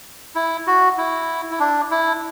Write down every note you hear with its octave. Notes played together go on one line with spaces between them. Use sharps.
E4
F#4
E4
E4
D4
E4